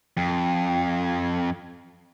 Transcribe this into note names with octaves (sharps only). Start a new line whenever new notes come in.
F2